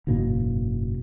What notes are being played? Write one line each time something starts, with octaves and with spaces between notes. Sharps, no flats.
F#1 G#2 B2 A#3